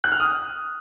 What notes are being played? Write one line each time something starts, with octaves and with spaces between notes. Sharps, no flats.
F#6
F6
D#6